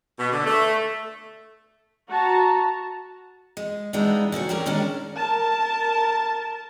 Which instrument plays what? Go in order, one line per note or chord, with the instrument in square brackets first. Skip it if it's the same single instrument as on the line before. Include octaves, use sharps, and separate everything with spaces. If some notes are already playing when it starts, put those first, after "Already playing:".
[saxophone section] B2
D3
A3
[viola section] F#4 A5 A#5
[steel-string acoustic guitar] G#3
E3 G3 G#3 B3 D4 D#4
A#2 D3 F#4 C#5
G3 C#4 G#4 A#4 D5
A#2 D#3 G#3 C#4 D4
[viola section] A#4 A5